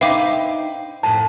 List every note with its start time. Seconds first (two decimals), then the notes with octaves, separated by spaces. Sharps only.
0.01 D#4 B4 C5 E5 F5 G5 D6
1.03 F2 A2 A5